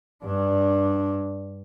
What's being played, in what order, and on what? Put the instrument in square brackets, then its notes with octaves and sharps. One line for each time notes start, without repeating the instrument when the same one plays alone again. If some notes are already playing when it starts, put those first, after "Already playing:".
[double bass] G2 D4